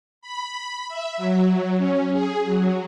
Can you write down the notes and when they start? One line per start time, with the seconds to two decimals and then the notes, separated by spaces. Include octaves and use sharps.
0.21 B5
0.88 E5
1.17 F#3
1.77 C#4
2.11 G#4
2.45 F#3